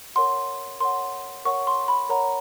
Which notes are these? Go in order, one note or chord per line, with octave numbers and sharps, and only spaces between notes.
A#4 C#5 F#5 C6
A#4 C#5 F#5 C6
A#4 C#5 F#5 C#6
C6
B5
A#4 C#5 F#5 A#5